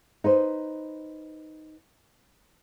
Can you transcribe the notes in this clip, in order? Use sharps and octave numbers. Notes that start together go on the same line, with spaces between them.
D#4 B4 C5